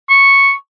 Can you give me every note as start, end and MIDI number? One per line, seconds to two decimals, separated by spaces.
0.10 0.53 85